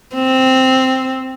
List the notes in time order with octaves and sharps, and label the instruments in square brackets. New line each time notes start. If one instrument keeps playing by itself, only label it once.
[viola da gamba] C4